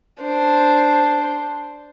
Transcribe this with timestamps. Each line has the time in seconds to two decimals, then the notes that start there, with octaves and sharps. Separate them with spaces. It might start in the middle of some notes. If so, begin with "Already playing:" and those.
0.22 D4 C5